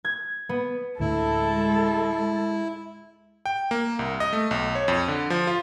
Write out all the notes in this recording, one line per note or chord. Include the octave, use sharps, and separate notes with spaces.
G#6
B3
D2 A2 D3 G#3 E4 A4
G5
A#3
C2
D#5
A3
B1
C#5
F2
D3
F3
F4